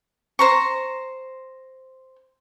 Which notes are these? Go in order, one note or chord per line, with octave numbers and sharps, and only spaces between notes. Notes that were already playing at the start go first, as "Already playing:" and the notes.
C5 A#5 C#6